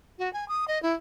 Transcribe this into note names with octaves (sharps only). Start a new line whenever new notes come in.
F#4
G#5
D#6
D#5
E4